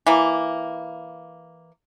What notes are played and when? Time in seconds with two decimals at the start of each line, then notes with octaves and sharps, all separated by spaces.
0.07 E3 A#3